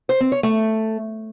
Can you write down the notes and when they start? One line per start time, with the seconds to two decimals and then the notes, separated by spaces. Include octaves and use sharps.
0.09 C5
0.20 C4
0.32 C#5
0.43 A3